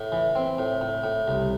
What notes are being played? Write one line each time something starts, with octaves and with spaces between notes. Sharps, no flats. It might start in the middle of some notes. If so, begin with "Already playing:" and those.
Already playing: A2
E3
C4
A2
A2
A2
C2